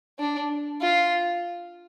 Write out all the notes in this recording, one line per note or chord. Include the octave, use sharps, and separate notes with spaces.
D4
F4